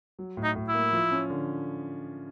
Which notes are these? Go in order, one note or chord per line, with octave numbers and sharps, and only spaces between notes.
F#3
A2
D#4
A2
E4
A#3
F3
C#4
D3